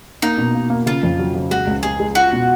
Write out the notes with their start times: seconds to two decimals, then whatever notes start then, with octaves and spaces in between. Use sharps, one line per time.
0.22 A#3 D#4
0.38 B2
0.55 A#3
0.70 A#3
0.86 C#3 F4
1.03 F2
1.19 F#3
1.35 C#3
1.51 G#3 F#4
1.67 C#2
1.83 G#3 G#4
2.00 G#3
2.15 F4 F#4
2.32 B2